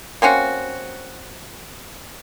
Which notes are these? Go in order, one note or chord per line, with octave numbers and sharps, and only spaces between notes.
A#3 C4 C#4 F#4